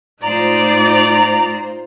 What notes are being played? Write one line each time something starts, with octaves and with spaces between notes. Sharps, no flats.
A2 D#4 F4 C5 D5 A#5